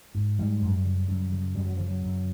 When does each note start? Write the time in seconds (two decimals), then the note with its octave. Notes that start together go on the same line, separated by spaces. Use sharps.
0.15 G#2
0.39 G#2 G3
0.62 F#2
0.85 C#3
1.08 F#2
1.32 C#3
1.55 F#2 G3
1.67 F#3
1.77 C#3 F3
1.88 F#3
2.03 F#2